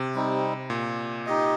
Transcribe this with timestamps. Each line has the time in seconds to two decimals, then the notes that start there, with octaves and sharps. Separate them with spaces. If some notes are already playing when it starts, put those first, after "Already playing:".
Already playing: C3
0.15 G3 C4 D#4
0.70 A#2
1.26 D#4 G4 D#5